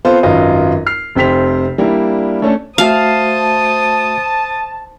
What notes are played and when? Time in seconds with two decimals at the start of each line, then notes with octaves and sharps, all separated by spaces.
0.05 B3 C4 F4 A4 B4 C5
0.23 G#1 F#2 F#3 F4 B4 D#5
0.86 F6 C7
1.15 F1 C3 G4 C5 B6 F7
1.78 G3 A#3 D4 E4
2.42 A3 C#4 D4 A4
2.78 A3 F#4 C5 E5 F5 A5 D#6